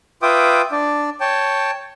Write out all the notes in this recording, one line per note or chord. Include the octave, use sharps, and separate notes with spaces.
F4 B4 E5 G5 D6 D#6
D4 D5
C#5 G5 A5